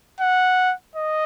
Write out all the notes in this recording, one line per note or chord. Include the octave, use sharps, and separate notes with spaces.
F#5
D#5